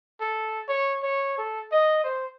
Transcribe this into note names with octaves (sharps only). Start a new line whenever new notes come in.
A4
C#5
C#5
A4
D#5
C5